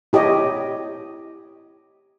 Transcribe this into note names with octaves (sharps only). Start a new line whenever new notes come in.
E4 G4 C#5 D#5